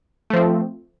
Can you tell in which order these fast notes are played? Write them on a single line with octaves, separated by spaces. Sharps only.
A3 F3 C4